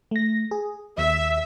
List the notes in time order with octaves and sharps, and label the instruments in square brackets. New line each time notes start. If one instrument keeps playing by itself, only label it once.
[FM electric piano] A3 A#6
G#4
[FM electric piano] D#2 [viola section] E5